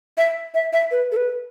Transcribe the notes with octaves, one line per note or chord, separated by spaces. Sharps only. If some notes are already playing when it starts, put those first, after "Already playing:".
E5
E5
E5
B4
A4
B4